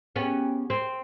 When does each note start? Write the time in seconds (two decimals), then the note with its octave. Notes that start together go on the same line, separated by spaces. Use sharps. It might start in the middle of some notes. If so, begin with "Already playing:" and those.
0.16 B3 C#4 G4 G#4 G5
0.70 C4